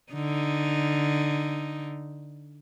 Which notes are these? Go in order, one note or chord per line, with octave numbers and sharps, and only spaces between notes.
D3 D#4